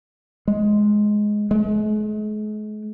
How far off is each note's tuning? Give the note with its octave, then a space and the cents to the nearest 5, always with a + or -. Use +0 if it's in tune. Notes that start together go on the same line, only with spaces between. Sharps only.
G#3 +10
G#3 +40